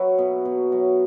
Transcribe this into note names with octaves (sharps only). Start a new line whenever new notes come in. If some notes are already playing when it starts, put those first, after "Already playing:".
Already playing: F#3 B4 C#5 E5
B2
B2
F#3